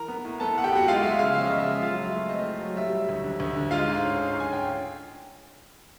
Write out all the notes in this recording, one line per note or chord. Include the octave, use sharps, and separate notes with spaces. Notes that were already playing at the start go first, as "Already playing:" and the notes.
Already playing: E3 A#4 A#5
B3
A2
B3 A4 A5
A2 F#5
G4 G5
B3 F#4 F#5
G#3 F4 F5
G#3 E5
C#3 F5
F3 E5
C#3 D#5
E5
G#3
F#3 F4 F5
F#3
E5
A3
C4 D#5
A2
F#3
G3 E5
G3
D2
D3
D2
D3
G#3 F4 F5
G#2
C#4
G#2
G#2
G#5
C#4 G5